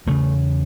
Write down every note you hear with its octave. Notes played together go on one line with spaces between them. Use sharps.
E2 C#3 A3